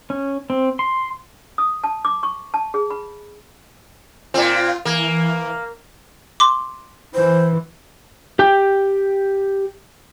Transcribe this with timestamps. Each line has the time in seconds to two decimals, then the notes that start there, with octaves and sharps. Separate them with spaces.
0.10 C#4
0.50 C4
0.79 C6
1.58 D#6
1.84 A5
2.05 D6
2.23 C#6
2.54 A5
2.74 G#4
2.90 B5
4.34 A#2 C4 F4
4.85 E3 A#3
6.40 C6 D6
7.15 E3 C5
8.39 G4 G5